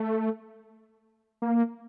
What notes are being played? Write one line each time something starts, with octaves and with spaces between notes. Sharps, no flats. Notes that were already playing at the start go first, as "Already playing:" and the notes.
Already playing: A3
A#3